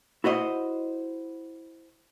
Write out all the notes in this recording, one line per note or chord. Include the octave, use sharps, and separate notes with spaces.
E4 F#4 C5 D#5